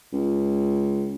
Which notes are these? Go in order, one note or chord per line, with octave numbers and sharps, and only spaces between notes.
C#2